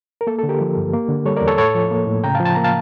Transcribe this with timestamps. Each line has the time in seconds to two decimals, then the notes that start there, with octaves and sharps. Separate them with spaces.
0.21 A#4
0.27 A#3 A4
0.39 D3 A4
0.49 G4 A#4
0.61 F3
0.77 G2
0.93 A#3
1.09 D3
1.26 G3 A4 C#5
1.37 E2 A#4 D5
1.48 A4 C#5
1.58 A2 A4 C#5
1.75 F3
1.91 A#3
2.07 A2
2.24 C#3 G5 A#5
2.35 F5 A5
2.40 F3
2.45 A5
2.55 A#3 A#5
2.64 F5 A5